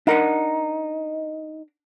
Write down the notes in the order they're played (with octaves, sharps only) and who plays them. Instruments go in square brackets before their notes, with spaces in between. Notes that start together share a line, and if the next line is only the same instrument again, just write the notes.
[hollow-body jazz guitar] D4 A#4 F#5 [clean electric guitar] D#4